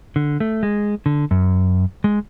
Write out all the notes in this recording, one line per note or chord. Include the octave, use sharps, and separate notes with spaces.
D3
A3
G#3
D3
F#2
G#3